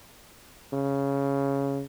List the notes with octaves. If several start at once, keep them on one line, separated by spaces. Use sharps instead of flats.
C#3